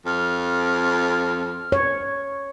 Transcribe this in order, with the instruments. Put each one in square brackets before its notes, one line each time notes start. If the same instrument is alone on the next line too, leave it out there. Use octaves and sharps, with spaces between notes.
[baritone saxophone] F2 [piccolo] F6
[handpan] C#5